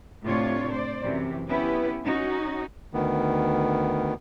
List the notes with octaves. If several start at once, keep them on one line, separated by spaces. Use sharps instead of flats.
A2 C3 A3 D4 F4 C#5
C5 D5
F#2 C3 E3
B3 C#4 E4 G4 B4
C#4 D#4 F#4
D2 D#3 B3